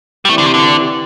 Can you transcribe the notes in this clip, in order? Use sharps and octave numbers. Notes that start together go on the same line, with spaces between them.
G3
E3 A3 C4 G4 D5
D3
C3
D3